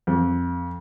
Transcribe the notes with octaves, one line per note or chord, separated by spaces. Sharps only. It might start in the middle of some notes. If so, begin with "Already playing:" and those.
F2